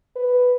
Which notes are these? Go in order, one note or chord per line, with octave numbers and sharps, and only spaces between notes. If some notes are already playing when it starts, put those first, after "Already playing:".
B4